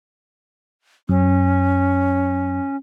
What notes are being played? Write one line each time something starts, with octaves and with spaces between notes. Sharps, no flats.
F#2 C#4